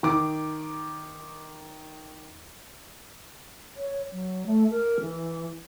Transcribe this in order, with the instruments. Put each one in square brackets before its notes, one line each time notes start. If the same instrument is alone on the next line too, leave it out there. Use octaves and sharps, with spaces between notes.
[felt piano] D#3 D6
[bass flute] C#5
F#3
A3
A#4
E3